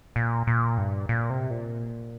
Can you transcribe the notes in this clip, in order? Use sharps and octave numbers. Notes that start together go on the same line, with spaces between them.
A#2
A#2
G2
A#2
C3
A#2